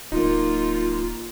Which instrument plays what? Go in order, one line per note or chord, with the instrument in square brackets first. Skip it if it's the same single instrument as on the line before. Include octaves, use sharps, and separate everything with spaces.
[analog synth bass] D1 [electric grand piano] A#3 D#4 [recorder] F4